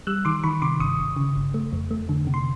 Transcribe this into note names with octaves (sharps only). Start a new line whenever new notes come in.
G3 E6 F#6
D#3 C6 D6
D#3 B5 C#6
C3 C6 D6
G1 C#6 D#6
G1
C#3
G1
A3
F2
A3
D3
C3
C6